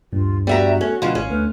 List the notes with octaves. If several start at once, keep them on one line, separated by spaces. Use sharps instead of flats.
D2 G2 A#2 F4
G3 B3 F#4 E5 F#5 A#5
A3 C#4
D2 B2 F3 F5 C6
G#1 C#4
D2 A3 B4 F6